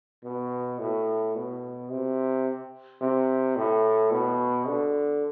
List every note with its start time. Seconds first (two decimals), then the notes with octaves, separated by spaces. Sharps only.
0.24 B2
0.79 A2
1.35 B2
1.91 C3
3.01 C3
3.56 A2
4.11 B2
4.67 D3